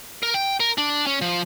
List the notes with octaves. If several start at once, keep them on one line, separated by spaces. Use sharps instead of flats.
A#4
G5
A#4
D4
C#4
F3